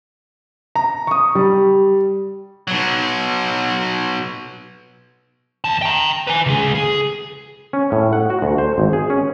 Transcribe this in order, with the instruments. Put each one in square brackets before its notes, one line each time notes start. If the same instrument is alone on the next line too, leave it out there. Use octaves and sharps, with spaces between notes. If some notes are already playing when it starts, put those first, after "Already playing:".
[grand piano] A#5
C#6 D#6
G3
[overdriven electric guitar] B2 F#3
[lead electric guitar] E2 A5
G5 A#5
B4 G#5
C#2 G#4
G#4
[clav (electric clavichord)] C#4
A2
F#5
F#4
D2
C5
G#1
G#4
C#4